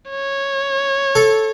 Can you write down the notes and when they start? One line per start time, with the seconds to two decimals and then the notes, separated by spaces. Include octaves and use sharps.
0.10 C#5
1.15 A4